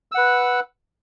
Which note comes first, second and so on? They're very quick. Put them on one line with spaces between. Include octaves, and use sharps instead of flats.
E6 F#5 B4